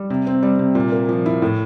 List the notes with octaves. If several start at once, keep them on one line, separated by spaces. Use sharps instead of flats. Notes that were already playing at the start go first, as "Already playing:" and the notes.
Already playing: G3
C3
C4
G3
C3
A#2
A#3
F3
E4
A2